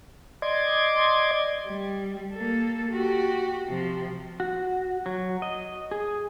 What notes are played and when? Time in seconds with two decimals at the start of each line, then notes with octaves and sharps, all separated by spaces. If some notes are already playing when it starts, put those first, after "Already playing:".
0.42 D5 D#5 C6 D6 G#6
1.66 G3
2.34 A#3 A4
2.92 F#4 G4
3.67 C3 F3
4.40 F#4
5.06 F#3
5.42 D#5
5.91 G#4